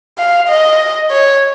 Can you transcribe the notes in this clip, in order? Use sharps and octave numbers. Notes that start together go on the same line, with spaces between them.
F5
D#5
C#5